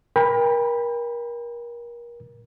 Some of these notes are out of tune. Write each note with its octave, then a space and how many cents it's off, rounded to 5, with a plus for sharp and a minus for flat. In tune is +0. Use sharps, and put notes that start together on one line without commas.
A#4 +30 G5 +35 B5 +0